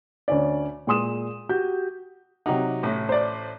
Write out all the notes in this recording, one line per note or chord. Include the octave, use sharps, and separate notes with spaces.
D2 C#4 D5
A#2 G#3 C6 D#6 E7
F#4 G4 G6
C3 F#3 D#4 G4 F#5
A1 A2
C5 D5